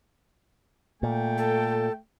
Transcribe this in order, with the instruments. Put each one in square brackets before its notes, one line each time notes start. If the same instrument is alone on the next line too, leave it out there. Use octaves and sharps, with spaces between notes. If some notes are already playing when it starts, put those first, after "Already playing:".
[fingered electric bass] A#2 [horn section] A3 G5
[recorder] A4